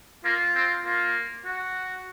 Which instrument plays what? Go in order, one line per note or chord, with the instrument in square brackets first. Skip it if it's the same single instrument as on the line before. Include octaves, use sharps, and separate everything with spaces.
[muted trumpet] A#3 [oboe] F4
[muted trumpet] C4
[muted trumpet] A#3 [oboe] F4
[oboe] F#4